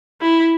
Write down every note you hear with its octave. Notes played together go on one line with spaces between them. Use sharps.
E4